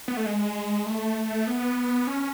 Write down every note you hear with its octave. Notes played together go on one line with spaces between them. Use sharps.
B3
A3
G#3
A3
B3
C#4